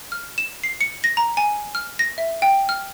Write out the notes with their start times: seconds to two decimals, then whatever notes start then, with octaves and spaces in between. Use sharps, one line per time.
0.12 F6
0.38 E7
0.64 C7
0.81 C#7
1.04 A#6
1.17 A#5
1.37 G#5
1.75 F6
1.99 A#6
2.18 E5
2.42 G5
2.69 F6